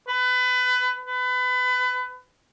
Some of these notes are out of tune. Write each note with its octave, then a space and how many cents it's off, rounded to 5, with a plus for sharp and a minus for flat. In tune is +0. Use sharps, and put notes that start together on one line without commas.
B4 +25
B4 +25